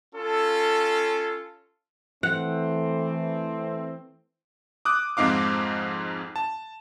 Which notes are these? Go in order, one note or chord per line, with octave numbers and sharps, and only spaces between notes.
C#4 F4 A4
E3 A3 C4 F#5
D6 D#6 F#6
F2 G#2 C4 D#4 F5 D6
A5